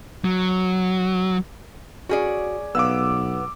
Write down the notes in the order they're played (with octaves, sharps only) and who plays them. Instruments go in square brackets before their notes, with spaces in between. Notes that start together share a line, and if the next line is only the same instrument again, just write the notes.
[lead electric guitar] F#3
[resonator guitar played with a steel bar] C#4 G#4 D5 [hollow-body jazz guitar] F#4
[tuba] B1 [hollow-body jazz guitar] B3 F5 [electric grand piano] D6 E6